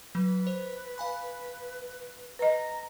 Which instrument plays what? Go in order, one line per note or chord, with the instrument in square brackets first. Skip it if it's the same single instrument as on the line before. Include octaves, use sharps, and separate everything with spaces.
[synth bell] F#3 [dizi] B4
[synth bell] C5
F5 G#5 B5
[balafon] B4 D#5 [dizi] A#5